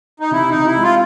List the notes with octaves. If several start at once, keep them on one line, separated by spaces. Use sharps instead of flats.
D#4
C3 E4
D#4
C3
E4
G#3
F4